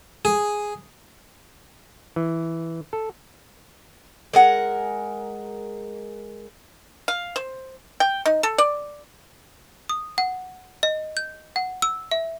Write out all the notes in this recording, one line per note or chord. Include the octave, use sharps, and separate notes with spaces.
G#4
E3
A4
G#3 A#4 F#5
F5
C5
G5
D#4
A4
D5
D#6
F#5
D#5
G6
F#5
E6
E5